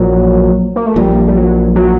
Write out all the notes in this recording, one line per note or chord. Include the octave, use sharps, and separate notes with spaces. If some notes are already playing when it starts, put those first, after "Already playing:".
Already playing: A#1 A#2 F#3
A#3
A3
A#1 A#2 G3
G3
F#3
F#3